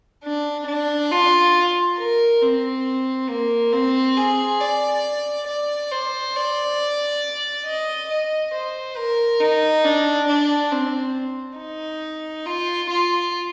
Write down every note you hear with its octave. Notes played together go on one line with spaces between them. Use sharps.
D4
D4
F4
A#4
C4
A#3
C4
G#4
D5
D5
C5
D5
D#5
D#5
C5
A#4
D#4
D4
D4
C4
D#4
F4
F4